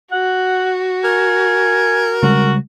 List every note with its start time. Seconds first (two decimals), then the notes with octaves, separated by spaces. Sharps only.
0.12 F#4 F#5
1.04 A#4 G#5
2.23 C#3 G3 G#3 F#4